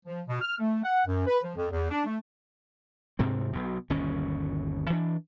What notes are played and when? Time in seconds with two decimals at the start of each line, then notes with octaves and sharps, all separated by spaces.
0.06 F3
0.28 B2
0.42 F6
0.59 A3
0.84 F#5
1.07 F#2
1.27 B4
1.43 F3
1.56 F2
1.71 E2
1.91 D4
2.05 A3
3.19 D2 G#2 C3 C4
3.53 B1 B2
3.90 G1 D#2 B2 C#4
4.90 E3 D4